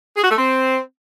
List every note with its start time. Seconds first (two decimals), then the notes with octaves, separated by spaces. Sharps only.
0.17 G#4
0.24 F#4
0.31 A3
0.38 C4